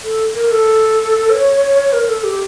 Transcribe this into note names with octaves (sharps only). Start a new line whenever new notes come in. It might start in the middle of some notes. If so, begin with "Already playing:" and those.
A4
A#4
A4
C#5
A#4
A4
G4